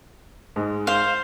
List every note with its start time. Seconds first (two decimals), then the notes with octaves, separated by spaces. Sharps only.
0.56 G#2 G#3
0.87 C5 F5